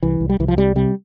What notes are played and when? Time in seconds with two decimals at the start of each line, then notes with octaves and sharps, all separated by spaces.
0.03 C2 E3
0.20 C2
0.30 G3
0.40 C2 E3
0.48 F3
0.57 C3 G3
0.76 C3 G3